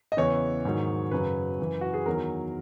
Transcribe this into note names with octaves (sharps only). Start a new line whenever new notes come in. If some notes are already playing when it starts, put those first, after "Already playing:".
D#5
E2 C#3 E3 C#5
G#2 D#3 F#3
F#2 C#3 F#3 B4
F#2 E3
F#4
G#4
E2 D#3 F#3 A#4